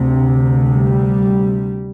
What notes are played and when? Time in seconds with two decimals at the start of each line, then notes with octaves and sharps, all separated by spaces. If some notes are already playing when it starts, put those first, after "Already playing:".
Already playing: D2 C3
0.65 G3